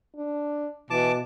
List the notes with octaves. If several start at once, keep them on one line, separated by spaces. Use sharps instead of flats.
D4
B2 E3 A5 D6